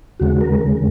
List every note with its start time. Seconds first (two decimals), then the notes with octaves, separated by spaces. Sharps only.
0.20 D#2 C#3 G#3 F#4
0.41 A#4